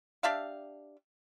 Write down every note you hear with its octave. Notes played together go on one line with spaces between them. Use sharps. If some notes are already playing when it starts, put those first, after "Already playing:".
D4 G4 E5 F5